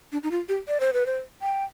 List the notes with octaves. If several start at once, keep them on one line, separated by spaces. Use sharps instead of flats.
D4
D#4
F4
G4
D5
C5
B4
C5
G5